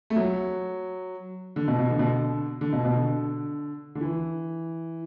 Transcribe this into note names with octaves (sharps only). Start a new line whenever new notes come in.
A3
F#3
D3
B2
B2
D3
B2
D3
D3
B2
B2
D3
D3
E3